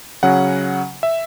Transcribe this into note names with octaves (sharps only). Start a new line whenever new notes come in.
C#3 F#3 C#4 F#5
E5